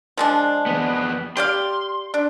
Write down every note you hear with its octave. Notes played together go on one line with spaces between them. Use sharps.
F3 G#3 D4
F2 B3
G4 D5 F5 C6
D4